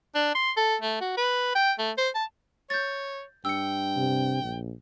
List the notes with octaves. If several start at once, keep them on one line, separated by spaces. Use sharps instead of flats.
D4
C6
A4
A3
F#4
B4
G5
A3
C5
A5
C#5 G6 A6
G2 G5 E6 C#7
C3
A#1